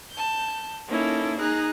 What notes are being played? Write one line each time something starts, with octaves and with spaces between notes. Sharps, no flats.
A5 G6
A#3 C#4 D#4 E4 A4
D#4 G#4 A#5 F#6